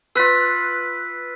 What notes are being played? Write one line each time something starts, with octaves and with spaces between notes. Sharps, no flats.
F4 B4 E6 F#6 B6